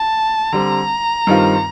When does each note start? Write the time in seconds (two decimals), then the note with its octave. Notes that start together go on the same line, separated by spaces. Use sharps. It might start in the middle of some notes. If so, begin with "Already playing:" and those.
Already playing: A5
0.52 D3 G3 C4 A#5
1.27 G2 D#3 G3 C4 F4